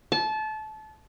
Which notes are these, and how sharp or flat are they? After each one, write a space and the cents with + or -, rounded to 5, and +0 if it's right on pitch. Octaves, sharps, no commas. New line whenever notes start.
A5 -25